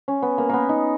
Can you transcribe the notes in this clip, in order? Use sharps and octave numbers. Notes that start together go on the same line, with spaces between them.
C#4
B3
A#3
A#3 B3
D#4